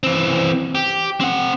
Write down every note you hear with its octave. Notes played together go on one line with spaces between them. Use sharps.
E3 C4
G4
C4 F#5